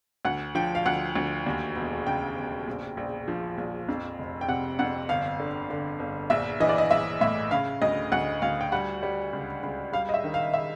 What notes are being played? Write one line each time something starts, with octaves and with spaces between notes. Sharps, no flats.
D2 F#5
F3 G5
F5
D2 F#5
D2
D#2
E1
C#3 G5
E1
A#1
A#1
F3
A#1
F2
F1
G5
C3 F#5
F2 F#5
G1 F5
D3
D3
G1
A#1 E5
E3 D#5
D5
D#5
A#1 E5
A2 E5
C#3 F5
D2 D#5
D2 F#5
D2 F5
G5
G3 F#5
G3
C#2
C#2
G3 F5
D#5
E5
D#3
F5
E5